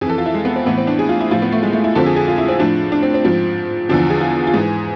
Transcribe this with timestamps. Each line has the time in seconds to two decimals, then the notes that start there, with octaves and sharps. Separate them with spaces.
0.01 F2 G#4
0.06 E3 A4
0.18 F4
0.26 E4
0.34 G#3
0.45 B3
0.56 C4
0.66 A2 E3 B3
0.77 C4
0.87 D4
0.99 G#4
1.09 F4
1.20 E4
1.31 A2 F3 F4
1.42 B3
1.52 A3
1.63 G#3
1.73 A3
1.84 E4
1.95 F2 D3 F3 A4
2.06 G#4
2.16 G#4
2.28 F4
2.38 E4
2.48 C4
2.59 A2 F3 D4
2.92 D4
3.03 C4
3.14 C4
3.25 G#2 F3
3.89 E2 D3 F3 D4
4.10 G#4
4.21 F4
4.47 F4
4.54 G#2 E3 G#4